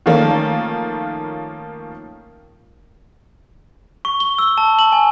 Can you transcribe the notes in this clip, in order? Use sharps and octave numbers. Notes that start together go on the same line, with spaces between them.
D#3 F3 A3 A#3 C#4
C#6
G7
E6
A5
F#7
G#5